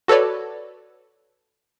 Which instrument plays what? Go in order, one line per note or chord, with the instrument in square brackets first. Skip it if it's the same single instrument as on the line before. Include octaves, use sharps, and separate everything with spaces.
[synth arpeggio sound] F#4 A4 B4 C#5 D5